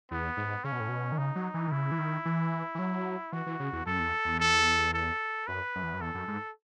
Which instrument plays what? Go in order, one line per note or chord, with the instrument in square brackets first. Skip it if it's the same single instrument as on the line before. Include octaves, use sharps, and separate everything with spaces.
[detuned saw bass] E2 [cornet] B3
[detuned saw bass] G#2
[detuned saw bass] C#3 [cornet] C#4
[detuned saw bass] B2
A2
B2
D#3
[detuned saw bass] C#3 [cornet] D#4
[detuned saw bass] F#3
E3
D#3
[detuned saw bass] C#3 [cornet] E4
[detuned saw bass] E3
D#3
E3
E3
F#3
[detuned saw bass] E3 [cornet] F#4
[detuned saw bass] E3
C#3
E2
[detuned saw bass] F#2 [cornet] A4
[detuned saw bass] E2
E2
[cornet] A4
A4
[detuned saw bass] F#2 [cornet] B4
[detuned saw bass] F#2
E2
F#2
[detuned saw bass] E2 [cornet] A4
[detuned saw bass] F#2
G#2